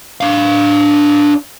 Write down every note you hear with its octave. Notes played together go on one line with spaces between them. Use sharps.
D4 F5